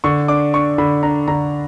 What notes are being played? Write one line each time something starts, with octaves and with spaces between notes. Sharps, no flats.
D3 C#6
D4 D6
D4 C#6
D3 B5
D4 A#5
D3 A#5